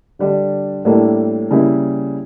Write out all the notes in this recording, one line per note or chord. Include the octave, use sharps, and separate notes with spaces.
D3 G3 D4
A2 G3 A#3 D4 A4
C#3 G3 A#3 E4